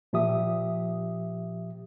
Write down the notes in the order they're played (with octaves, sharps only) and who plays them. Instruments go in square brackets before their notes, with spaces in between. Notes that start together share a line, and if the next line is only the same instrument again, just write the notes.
[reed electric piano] A#2 F3 G4 E5 D#6